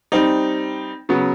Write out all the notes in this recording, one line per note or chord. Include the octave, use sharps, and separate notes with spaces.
G3 C4 D#4
C#3 F#3 B3